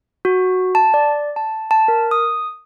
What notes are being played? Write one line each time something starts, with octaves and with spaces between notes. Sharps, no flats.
F#4
A5
D5
A5
A5
A#4
D#6